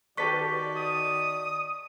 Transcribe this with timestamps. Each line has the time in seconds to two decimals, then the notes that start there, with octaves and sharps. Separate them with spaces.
0.17 D#3 F#4 G4 A4 B4 D5 C#6 B6
0.76 D#6